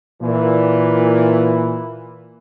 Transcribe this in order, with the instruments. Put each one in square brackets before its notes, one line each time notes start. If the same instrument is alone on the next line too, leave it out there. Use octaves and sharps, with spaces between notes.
[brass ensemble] A#2 E3